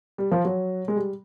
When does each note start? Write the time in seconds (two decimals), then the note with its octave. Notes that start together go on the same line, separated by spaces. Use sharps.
0.18 G3
0.31 F3
0.45 F#3
0.88 G#3
0.96 G3